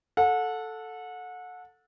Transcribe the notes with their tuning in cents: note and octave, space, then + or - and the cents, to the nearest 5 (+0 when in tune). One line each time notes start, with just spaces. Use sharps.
A4 +0 F#5 -30